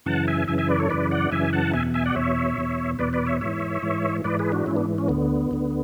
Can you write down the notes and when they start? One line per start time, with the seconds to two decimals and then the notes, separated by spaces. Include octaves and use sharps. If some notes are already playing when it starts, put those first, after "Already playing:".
0.06 F#2 C#3 E3 F#5 A5
0.28 E5 G#5
0.48 F#2 C#3 E3 E5 G#5
0.58 E5 G#5
0.69 B4 D5
0.79 A4 C#5
0.90 F#2 C#3 E3 B4 D5
1.11 D5 F#5
1.31 F#2 C#3 E3 E5 G#5
1.53 F#5 A5
1.73 E2 B2 E5 G#5
1.94 E5 G#5
2.05 D5 F#5
2.16 E2 B2 C#5 E5
2.58 E2 B2
2.99 E2 B2 B4 D5
3.13 B4 D5
3.27 C#5 E5
3.41 G#2 E3 C#5 E5
3.82 G#2 E3
4.24 G#2 E3 B4 D5
4.39 G#4 B4
4.52 D4 F#4
4.66 G#2 E3 C#4 E4
4.76 B3 D4
4.98 C#4
5.08 D2 D3 B3
5.51 D2 D3